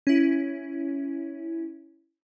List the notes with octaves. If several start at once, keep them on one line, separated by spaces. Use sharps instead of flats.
C#4 E4